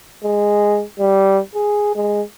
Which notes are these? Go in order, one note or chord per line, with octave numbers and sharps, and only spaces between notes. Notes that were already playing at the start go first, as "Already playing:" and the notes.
G#3
G3
G#4
G#3